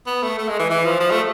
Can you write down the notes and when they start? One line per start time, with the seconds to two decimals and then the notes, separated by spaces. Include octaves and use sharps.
0.06 B3
0.22 A3
0.39 A3
0.48 G#3
0.59 E3
0.70 E3
0.85 F3
1.00 F3
1.11 A3